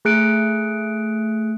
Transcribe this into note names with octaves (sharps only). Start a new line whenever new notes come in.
A3 G#4 F#6 C#7 D7